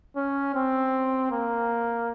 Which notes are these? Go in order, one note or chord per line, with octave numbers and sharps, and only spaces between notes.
C#4
C4
A#3